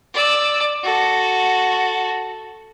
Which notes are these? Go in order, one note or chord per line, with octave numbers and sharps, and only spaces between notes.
D5 E6
F#4 A4